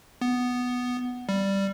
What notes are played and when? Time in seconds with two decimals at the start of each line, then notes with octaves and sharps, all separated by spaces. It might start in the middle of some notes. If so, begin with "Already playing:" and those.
0.21 B3
1.29 G3